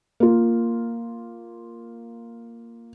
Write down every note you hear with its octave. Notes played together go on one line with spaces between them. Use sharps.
A#3 F4